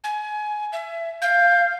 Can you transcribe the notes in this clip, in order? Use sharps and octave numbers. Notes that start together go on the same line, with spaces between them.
G#5
E5
F5 G6